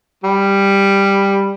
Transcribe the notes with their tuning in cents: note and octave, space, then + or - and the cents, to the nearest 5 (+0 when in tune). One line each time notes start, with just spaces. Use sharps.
G3 +10